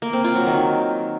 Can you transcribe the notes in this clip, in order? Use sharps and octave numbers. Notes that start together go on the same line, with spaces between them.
A#3
C4
F4
F#3
D#3